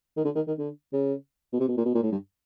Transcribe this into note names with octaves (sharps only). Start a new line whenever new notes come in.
D#3
D3
D#3
D#3
D3
C#3
B2
C3
B2
A#2
B2
A#2
A2
G2